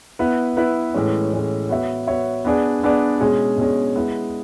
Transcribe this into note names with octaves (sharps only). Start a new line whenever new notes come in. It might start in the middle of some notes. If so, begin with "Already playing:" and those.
B3 E4 B4
B3 E4 B4
A2 E3 G#3 C#4
A2 E3 G#3 C#4
B3 F#4 C#5 E5
B3 F#4 C#5 E5
B3 D4 G#4 D5
B3 D4 G#4 D5
B2 G#3 C#4 G#4
B2 G#3 C#4 G#4
G#3 B3 E4 G#4